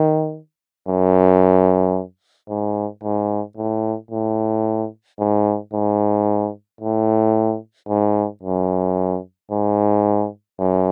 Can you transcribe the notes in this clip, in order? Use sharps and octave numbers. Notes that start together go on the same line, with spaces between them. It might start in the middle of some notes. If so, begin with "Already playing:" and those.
Already playing: D#3
F#2
G#2
G#2
A2
A2
G#2
G#2
A2
G#2
F#2
G#2
F#2